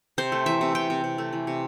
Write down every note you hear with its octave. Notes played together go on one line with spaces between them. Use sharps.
C3 C5
A3
E3 E5
C3
C3 G5
C3
C3
A3
E3
C3